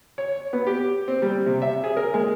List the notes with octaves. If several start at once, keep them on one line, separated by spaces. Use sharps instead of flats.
C#5
B3
G4
C4
G3
C3
E5
G#4
A#4
G#3